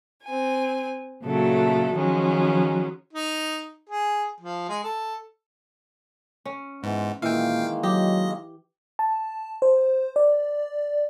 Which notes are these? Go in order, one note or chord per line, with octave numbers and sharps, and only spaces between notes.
C4 G#5
A#2 C#3 F#3 A3 A4
D#3 F3 F#3 G#3 C#4
D#4
G#4
F3
G#3
A4
C#4
G#2 E3 G#3 B3
A#2 D#3 E3 G#3 A#3 F5 G5
F#3 G4 D#5
A5
C5
D5